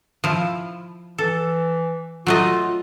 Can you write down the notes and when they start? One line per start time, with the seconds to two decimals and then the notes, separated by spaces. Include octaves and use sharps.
0.24 F3 E4
1.18 E3 A4
2.27 F#3 A3 F4 D#5